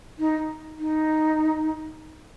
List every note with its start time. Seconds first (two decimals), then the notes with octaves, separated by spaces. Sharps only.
0.19 D#4
0.80 D#4